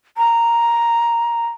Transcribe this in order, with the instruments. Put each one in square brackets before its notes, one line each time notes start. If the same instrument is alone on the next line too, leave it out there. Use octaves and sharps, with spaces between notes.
[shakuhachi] A#5